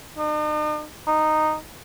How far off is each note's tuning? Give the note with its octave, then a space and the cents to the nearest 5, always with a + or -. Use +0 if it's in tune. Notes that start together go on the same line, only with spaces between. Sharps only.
D#4 -45
D#4 -10